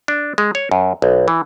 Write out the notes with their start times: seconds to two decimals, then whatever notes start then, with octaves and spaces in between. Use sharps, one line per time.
0.08 D4
0.38 G#3
0.55 C#5
0.71 F#2
1.02 B1
1.28 E3